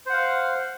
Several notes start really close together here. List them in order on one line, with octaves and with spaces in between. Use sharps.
C5 F#5 F5